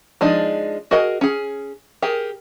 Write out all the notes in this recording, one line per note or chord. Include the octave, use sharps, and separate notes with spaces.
F3 G#3 D4 D#4
F#4 G#4 A#4 D#5
C#4 G#4
G4 G#4 A#4